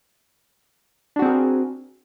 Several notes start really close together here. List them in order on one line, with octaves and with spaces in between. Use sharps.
D4 F#4 C4 G#4 A#4